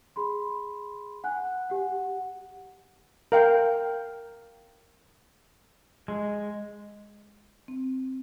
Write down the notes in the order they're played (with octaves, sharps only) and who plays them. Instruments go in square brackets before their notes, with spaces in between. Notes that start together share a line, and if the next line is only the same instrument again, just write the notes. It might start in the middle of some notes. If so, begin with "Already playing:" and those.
[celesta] G#4 B5 C6
F#5 G#5 F#6
G4 F#5
[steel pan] A#4 F5 G5
[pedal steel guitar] G#3
[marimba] C4